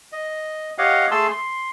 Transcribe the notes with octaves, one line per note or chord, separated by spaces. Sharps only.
D#5
G4 C#5 D#5 F5 F#5
A3 G#4 A5 C6 E6
C6